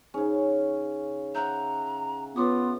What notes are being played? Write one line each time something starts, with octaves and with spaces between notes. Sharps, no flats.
C#3 C#4 D#4 G#4
E5 F#5 A#5 G6
B3 F4 B4 C#5 D6 D#6